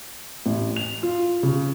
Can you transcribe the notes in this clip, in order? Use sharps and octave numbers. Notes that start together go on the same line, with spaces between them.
A1
F7
F4
C#3